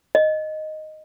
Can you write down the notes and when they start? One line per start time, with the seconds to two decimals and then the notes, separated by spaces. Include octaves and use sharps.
0.15 D#5